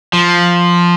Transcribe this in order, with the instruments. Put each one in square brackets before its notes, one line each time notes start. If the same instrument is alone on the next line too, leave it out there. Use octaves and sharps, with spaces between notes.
[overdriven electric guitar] F3